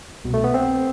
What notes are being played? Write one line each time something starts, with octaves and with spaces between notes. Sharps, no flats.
C2 B2
A3
B3
C4